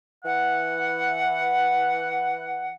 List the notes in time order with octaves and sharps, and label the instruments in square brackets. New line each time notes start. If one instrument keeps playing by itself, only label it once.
[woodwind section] E3 F#5